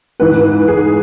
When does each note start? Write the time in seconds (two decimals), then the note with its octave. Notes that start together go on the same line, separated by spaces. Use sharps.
0.20 G#2 E3 B4
0.68 G#4